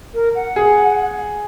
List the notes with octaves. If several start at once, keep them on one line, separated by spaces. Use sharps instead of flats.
A#4
F#5
G#4